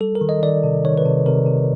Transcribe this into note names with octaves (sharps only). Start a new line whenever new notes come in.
G3 A4
A#4
D#3
D#5
D#3 D5
C3
D#3 C#5
B4
C3
C3 A#4
C3